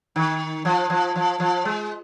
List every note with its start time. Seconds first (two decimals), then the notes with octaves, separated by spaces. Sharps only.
0.16 D#3
0.65 F3
0.90 F3
1.16 F3
1.40 F3
1.65 G#3